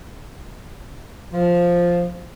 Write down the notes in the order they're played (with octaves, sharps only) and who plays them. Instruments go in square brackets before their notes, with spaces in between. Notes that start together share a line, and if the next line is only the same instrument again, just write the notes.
[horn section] F3